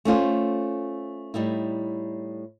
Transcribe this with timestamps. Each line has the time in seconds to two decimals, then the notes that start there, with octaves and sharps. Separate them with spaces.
0.05 A3 C#4 F4 C5
1.34 A2 G3 D#4 E4